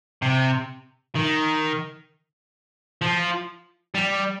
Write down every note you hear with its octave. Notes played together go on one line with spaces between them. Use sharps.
C3
D#3
F3
G3